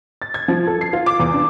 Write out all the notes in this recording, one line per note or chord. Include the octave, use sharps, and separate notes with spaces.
A6
G#6
F3
A4
C7
F4
D6
E2
D4